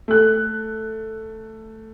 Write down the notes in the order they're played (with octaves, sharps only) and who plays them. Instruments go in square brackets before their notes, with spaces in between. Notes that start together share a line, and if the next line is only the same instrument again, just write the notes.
[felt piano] A3 F#6